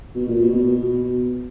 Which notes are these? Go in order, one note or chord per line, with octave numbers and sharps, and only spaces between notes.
B2
A#2
B2
B2